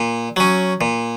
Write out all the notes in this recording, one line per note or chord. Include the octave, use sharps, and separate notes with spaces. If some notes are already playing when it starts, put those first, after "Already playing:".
Already playing: A#2
F#3 C#4
A#2